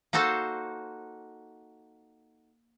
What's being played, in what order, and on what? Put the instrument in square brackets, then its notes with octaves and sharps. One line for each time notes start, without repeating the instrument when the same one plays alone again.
[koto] A#3 D#4 F#4 A4 C5